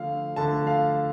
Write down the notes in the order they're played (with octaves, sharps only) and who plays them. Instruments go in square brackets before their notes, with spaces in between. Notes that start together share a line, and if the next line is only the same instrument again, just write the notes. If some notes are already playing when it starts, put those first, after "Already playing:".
Already playing: [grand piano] D3 F3 A3 F5
D3 F3 A3 A5
F5